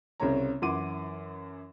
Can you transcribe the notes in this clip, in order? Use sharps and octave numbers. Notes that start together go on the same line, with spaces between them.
C2 C#3 C4 C#4 C#5 A#5
F#2 E3 F#5 C6 D6 D#7